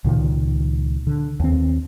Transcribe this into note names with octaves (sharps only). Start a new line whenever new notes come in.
C#2 A#2 D#3
D3
D#2 C4